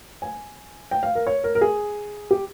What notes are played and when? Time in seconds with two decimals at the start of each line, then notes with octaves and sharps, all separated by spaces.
0.22 G#5
0.91 G5
1.03 F5
1.15 A#4
1.27 C#5
1.44 A#4
1.55 A#4
1.61 G#4
2.31 G4